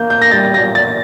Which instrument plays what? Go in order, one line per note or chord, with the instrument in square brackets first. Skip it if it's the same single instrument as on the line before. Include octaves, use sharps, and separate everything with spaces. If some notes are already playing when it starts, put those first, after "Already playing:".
Already playing: [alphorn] A#3 [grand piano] G6
[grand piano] G6
A#6
[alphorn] G3 [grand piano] A6
[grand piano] A#6
[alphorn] A#2
[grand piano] A6